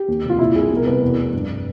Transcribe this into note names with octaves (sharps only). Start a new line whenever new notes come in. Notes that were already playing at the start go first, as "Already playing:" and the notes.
Already playing: G4
D#2
F1
F4
A#2 E4
C2 G#4
B2
A#4
C2 B4
E2
F1
G2